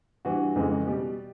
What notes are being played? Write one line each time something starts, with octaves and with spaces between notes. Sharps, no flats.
G2 E3 G3 F#4
F2 C#3 E3 G#3
B2 G3 G4